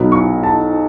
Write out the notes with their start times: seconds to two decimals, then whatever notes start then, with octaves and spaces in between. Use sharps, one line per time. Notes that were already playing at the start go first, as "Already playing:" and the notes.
Already playing: B1 B2 F#3 B3
0.12 C#6
0.43 A5